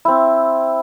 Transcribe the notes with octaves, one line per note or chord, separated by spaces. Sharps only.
C4 E4